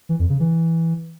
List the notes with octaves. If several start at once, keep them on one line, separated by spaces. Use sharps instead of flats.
E3
F2
C#3
E3